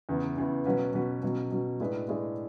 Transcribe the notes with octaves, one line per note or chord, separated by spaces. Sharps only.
E2 C#3 E3
E2 C#3 E3
B2 F#3 C#4 F#4 B4
B2 F#3 C#4 F#4 B4
B2 F#3 C#4
B2 F#3 C#4
A2 G#3 D4 G#4 B4
A2 G#3 D4 G#4 B4